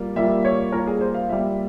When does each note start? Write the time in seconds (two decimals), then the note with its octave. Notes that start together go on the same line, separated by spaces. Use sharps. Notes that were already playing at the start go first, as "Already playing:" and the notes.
Already playing: G3 A#3 F4
0.16 G3 A#3 F4 E5
0.45 C#5
0.72 G3 A#3 F4 A#4
0.87 G#4
1.01 C5
1.14 F5
1.28 G3 A#3 F4 E5